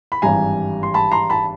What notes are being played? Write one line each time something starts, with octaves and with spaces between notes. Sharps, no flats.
B5
G#1 G2 E3 G3 G#5 A#5
C6
A5 B5
A#5 C6
A5 B5